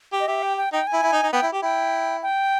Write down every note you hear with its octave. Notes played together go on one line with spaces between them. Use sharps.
G4
D#5
G4 E5
G5
G5
D#4 G5
G#5
E4
E4
D#4
D#4
B3 G5
E4
G4
E4 G5
G5